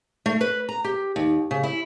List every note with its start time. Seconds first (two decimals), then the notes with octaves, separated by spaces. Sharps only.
0.26 A3
0.41 B4
0.69 A#5
0.84 G4
1.16 D#2
1.51 C#3
1.63 E4